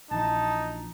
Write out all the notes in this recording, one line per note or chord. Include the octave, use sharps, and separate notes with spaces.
A#1 E3 D#4 A5